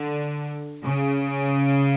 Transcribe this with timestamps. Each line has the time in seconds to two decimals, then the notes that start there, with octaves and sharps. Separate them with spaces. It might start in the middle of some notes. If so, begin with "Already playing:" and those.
Already playing: D3
0.85 C#3